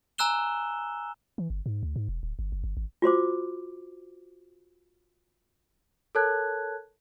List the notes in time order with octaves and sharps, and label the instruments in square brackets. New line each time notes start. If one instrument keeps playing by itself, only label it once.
[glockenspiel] G#5 A#5 E6 F#6 E7 G7
[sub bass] E3
G1
G#2
D2
G#2
E1
D1
G1
F#1
G1
G#1
[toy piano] F4 F#4 C5 D6
[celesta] A4 A#4 C#5 A5 F#6 G#6